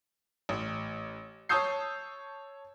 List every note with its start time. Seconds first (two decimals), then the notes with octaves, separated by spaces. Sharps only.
0.49 A1
1.49 C#5 A5 D#6 E6 G6 C7